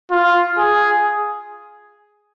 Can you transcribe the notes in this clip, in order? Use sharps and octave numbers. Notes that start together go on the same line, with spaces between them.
F4
G#4